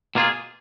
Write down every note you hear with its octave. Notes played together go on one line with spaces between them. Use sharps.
B2 A#3 F4 G#4